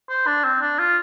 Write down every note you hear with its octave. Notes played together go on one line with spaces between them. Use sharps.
C5
D4
C4
D4
F4